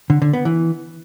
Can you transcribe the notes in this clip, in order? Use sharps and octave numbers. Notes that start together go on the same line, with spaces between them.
D3
D3
B3
E3